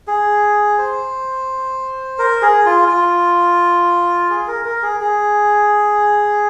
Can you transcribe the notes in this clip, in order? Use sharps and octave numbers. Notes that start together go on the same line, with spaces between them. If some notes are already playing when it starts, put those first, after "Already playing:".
G#4
C5
A#4
G#4
F4
F4
G#4
A#4
A#4
G#4
G#4